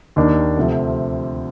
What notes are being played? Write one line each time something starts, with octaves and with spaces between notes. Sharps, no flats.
D#2 D#3 A#3 D4
D2 C3 F3 C4